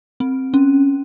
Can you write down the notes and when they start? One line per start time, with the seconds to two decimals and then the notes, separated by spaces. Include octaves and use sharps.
0.20 C4
0.54 C#4